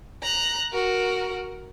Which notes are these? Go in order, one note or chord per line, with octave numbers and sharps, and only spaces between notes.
A#5 F#6
F#4 A#4